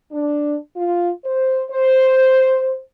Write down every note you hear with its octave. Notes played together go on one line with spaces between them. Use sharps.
D4
F4
C5
C5